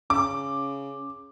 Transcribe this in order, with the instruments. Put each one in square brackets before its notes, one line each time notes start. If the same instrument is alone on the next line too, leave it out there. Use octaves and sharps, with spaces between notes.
[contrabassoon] C#3 [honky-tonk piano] D6